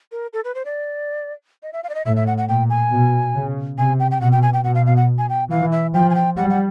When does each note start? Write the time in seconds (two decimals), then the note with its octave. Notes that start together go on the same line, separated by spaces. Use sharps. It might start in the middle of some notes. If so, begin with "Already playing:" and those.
0.12 A#4
0.33 A4
0.44 B4
0.55 C5
0.65 D5
1.63 D#5
1.73 E5
1.84 F5
1.89 D5
1.95 D#5
2.06 A2 E5
2.16 E5
2.27 F#5
2.38 F#5
2.48 A#2 G5
2.70 G#5
2.92 B2
3.35 C#3
3.78 C3 G#5
3.99 G5
4.11 G5
4.21 B2 F#5
4.32 G5
4.42 G#5
4.53 G5
4.64 B2 F#5
4.75 F5
4.86 F5
4.96 F#5
5.18 G#5
5.29 G5
5.50 E3 F5
5.72 E5
5.94 F3 G5
6.10 G#5
6.15 G5
6.36 G3 F#5
6.50 F#5